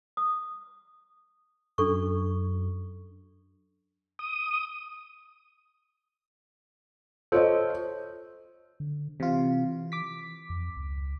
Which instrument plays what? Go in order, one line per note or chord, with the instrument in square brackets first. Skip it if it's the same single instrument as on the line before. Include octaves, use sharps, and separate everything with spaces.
[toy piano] D#6
[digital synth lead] F#2 [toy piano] D4 A4 C#6
[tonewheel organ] D#6
[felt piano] F4 C#5 D#5 [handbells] A4 C5
[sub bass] D3
[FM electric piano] C3 F4 [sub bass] E3
[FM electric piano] D6 B6
[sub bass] F2
C#2